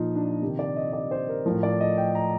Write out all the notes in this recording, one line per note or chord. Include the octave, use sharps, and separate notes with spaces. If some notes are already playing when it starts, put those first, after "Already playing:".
Already playing: A#2 F3 D#4 F4 D#5
D4
D4
C3 D#3 G4
D5
D#5
D5
C5
A#4
A2 F3 A#4
D5
D#5
G5
A#5